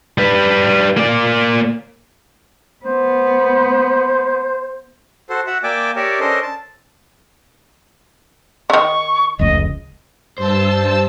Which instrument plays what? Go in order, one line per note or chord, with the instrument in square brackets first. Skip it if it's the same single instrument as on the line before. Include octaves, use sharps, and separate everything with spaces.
[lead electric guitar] G3 B4
A#3 D5
[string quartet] B3 [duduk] C5
[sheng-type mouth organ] F#4 A4 C5
F#4 E5 F#5
A#3 D5 E5 G5 G#5 D6
G4 A#4 C#5 D5 E5
C#4 D4 A4 A#4 C5 D#5
A5
[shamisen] D3 D#3 [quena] C#6
[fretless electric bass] F1 C#2 [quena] D#5
[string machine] G2 A5 E6 [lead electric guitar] C5